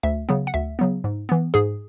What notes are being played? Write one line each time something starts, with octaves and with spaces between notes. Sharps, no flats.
D2 E5
C#3 F#3 B3
F#5
D2 E5
C#3 F#3 B3
G#2
E3 B3
G#2 G#4